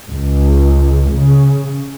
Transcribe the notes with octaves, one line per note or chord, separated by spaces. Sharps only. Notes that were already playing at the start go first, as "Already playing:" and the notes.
C#2
C#3